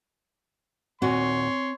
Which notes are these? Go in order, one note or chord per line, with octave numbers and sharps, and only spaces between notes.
D#2 A#2 C4 F#4 C#5 G#5 C6